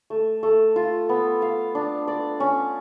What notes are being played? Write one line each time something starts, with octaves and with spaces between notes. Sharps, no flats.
A3
A3
F4
B3
F5
D4
D5
C#4